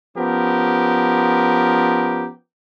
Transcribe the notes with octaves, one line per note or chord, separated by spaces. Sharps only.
F3 B3 C#4 G4 A#4